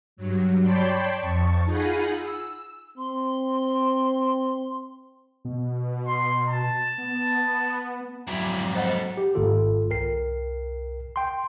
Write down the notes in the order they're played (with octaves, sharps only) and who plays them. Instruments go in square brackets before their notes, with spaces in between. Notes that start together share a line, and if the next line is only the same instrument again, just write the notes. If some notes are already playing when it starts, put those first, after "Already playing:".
[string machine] G2 F#3
C#5 D5 G5 A5 B5 C6
F2 A5 C#6
D#4 F4 G#4 F#5 G#5 B5
E6
[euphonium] C4 [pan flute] C6
[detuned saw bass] B2
[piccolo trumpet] C6
A5
[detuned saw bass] B3
[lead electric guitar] F2 G#2 [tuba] F#3 [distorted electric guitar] E4 D5
[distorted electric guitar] A4 B4 [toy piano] C5 D#5 F#5
[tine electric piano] G4
G#1 G#2 D#3 A#3 F4 A4
C2 A#4 G5 C7
G5 C6